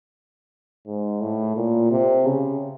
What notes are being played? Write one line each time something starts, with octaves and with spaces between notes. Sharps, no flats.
G#2
A2
A#2
C3
C#3